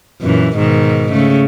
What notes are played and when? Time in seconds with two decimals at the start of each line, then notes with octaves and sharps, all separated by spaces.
0.21 F#2 A#2 E3
0.56 G#2 B2 D#3
1.12 C#3 A3